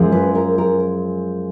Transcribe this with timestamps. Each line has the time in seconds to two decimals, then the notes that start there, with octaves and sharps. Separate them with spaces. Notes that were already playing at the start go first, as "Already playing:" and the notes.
Already playing: F#2 F3 G#3
0.12 B4
0.35 A#4
0.58 A#4